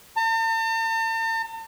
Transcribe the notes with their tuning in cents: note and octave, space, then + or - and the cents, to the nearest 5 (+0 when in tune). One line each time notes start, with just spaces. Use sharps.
A5 +45